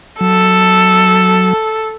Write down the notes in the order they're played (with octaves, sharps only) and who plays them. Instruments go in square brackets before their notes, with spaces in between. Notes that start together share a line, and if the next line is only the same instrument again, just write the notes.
[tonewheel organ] F#3 [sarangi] A4